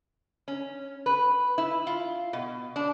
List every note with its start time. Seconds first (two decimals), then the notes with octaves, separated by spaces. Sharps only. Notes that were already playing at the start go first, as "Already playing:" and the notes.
0.48 C#4
1.06 B4
1.58 E4
1.87 F4
2.33 B2
2.76 D4